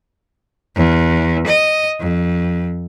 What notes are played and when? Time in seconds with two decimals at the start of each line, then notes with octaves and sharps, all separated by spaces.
0.76 E2
1.47 D#5
2.00 F2